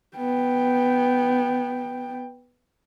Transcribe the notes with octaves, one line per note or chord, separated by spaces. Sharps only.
B3 G5